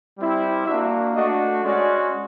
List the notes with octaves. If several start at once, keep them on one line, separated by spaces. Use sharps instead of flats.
G3 C4 E4 G4
A#3 D4 F#4 E5
A3 D4 F#4 D#5
G#3 C#4 F#4 D5